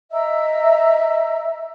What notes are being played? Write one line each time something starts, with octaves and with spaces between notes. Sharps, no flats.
D#5 E5 A#5 E6